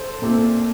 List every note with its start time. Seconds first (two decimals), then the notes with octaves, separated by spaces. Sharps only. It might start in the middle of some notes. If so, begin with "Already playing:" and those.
Already playing: A4 C5
0.22 A#2 A3 C4